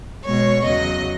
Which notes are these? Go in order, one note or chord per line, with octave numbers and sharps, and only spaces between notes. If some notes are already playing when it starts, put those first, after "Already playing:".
B2 G#3 C#5
E2 C#3 F#3 D#5